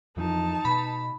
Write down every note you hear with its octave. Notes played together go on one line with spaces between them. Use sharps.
F2 E3 F3 D#4 A5
B2 B5